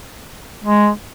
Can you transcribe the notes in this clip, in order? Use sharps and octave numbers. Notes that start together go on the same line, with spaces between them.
G#3